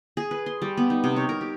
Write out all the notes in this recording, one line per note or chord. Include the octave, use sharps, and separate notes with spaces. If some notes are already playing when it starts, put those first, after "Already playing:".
G#4
B4
C6
G3
B3
D#4
C3
C#5
A#4
G4